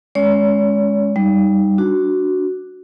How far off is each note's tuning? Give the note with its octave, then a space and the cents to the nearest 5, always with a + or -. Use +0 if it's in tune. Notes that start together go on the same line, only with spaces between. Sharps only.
G#3 +0 C#4 +0 C#5 +45
G3 +0 D#4 +0
D4 +0 F#4 +0